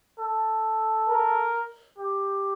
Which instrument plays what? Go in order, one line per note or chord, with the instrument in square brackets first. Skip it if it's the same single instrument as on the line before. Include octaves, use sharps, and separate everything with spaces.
[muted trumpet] A4
[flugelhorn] A#4
[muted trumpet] G4